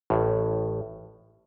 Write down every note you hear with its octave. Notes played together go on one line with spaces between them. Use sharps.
A1 A2